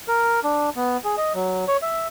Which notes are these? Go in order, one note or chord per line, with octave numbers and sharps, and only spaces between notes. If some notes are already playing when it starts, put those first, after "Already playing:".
A#4
D4
B3
G#4
D#5
F#3
C#5
E5